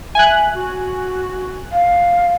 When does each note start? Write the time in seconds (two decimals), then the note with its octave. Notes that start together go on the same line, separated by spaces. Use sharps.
0.15 E5 G#5 F#6
0.54 F#4
1.71 F5